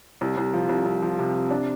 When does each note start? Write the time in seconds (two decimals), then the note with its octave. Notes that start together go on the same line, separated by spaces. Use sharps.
0.21 C2
0.37 C2
0.53 F3
0.69 C2
0.85 C2
1.02 F3
1.19 C3
1.35 C3
1.51 D4